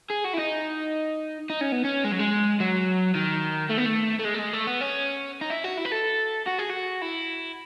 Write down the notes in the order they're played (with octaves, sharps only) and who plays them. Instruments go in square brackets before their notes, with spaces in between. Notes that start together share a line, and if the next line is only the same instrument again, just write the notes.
[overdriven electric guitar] G#4
F#4
E4
D#4
D#4
C#4
B3
C#4
G#3
F#3
G#3
F#3
D#3
A3
B3
A3
A3
G#3
A3
G#3
A3
B3
C#4
D#4
E4
F#4
E4
B4
A4
F#4
G#4
F#4
E4